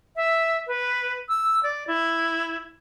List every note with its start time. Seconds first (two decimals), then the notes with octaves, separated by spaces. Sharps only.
0.16 E5
0.67 B4
1.29 E6
1.63 D5
1.87 E4